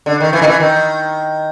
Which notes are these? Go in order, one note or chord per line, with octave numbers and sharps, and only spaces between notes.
D3
D#3
E3
D#3
E3
D#3